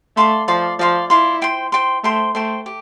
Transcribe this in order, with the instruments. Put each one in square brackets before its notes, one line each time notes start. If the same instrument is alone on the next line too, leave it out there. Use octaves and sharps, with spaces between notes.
[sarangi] A3 [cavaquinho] D5 F5 C6
[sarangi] F3 [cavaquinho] D5 F5 C6
[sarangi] F3 [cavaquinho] D5 F5 C6
[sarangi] E4 [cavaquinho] D5 F5 C6
[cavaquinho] C5 G5 C6
C5 G5 C6
[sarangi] A3 [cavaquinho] C5 G5 C6
[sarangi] A3 [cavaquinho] C5 G5 C6
[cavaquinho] G4